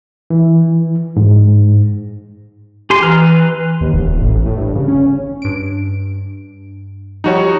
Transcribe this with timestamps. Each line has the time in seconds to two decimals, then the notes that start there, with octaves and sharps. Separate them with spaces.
0.30 E3
1.17 G#2
2.90 G4 G#5 C6
3.03 E3 B4 A#5 F6
3.22 B4
3.81 D#2
3.94 E1
4.08 D#1
4.20 A1
4.46 A2
4.57 G2
4.75 C#3
4.88 C#4
5.42 G2 D7
7.24 F3 G3 D#4 F#4 G4 C#5